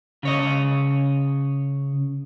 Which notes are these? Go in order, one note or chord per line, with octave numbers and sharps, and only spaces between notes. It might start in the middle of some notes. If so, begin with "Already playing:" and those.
C#3 C#5 D#5